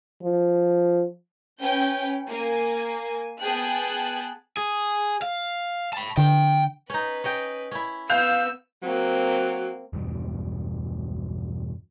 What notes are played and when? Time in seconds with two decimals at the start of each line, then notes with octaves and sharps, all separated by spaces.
0.22 F3
1.59 C#4 B4 G5 G6
2.31 A#3 G#5
3.40 B3 G#4 G5 A5 F#6
4.57 G#4
5.22 F5
5.93 A5 B5
6.17 D3 G5
6.90 C#4 D#4 B4
7.24 C#4 D#5 G5
7.71 C#4 E4
8.10 B3 F5 E6 G6 F7
8.83 F#3 A#3 C4
9.93 E2 G2 B2